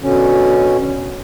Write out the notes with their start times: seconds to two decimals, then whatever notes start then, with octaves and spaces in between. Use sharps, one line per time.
0.03 B2 D3 C#4